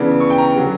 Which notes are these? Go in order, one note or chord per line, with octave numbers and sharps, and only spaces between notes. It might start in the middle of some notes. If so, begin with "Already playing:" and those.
Already playing: C#3 E3 B3 D4
C#6
G5
A#5
D3 F#3 C#4